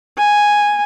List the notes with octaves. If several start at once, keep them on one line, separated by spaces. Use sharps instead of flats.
G#5